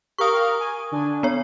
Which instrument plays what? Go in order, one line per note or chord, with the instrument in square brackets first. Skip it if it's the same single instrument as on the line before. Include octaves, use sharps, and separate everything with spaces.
[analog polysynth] G4 A#4 F5 [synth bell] C#6 D#6
[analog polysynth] G#5
D3 D4 G#5
[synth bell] B3 C#5